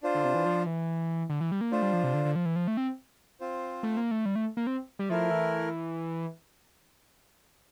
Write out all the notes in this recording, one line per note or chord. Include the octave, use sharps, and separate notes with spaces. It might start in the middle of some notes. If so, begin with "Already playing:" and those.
D4 F4 C5
D3
C3
E3
F3
E3
D3
E3
G3
A#3
A3 D4 F4 C5
G3
F3
C3
D3
D3
F3
E3
F3
A3
C4
C4 F4 C5
A3
A#3
A3
G3
A3
A#3
C4
G3
F3 A3 E4 A#4
E3